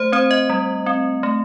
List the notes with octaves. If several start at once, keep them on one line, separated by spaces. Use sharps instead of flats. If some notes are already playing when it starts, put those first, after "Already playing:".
Already playing: A3 C5
C4 C5
D#5
G3
C4
A3